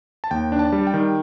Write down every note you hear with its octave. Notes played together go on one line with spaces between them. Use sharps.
A5
D#2 G5
D4
A5
G3
G5
D#3